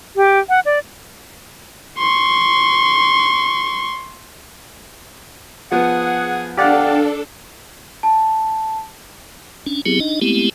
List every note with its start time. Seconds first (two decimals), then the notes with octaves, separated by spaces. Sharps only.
0.16 G4
0.49 F#5
0.65 D5
1.98 C6 C#6
5.72 F3 B3 G#4 F#5
6.57 D3 D4 G4 A4 B4 D5 F5 F#5
8.03 A5
9.66 C#4 D4
9.86 F#3 B3 C4 E4 G4 G#4
10.00 D4 D#4 D#5
10.21 G#3 A3 B3 C4 E4 G4